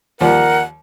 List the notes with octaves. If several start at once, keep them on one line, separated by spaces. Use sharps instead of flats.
D#2 F3 G3 A#4 F#5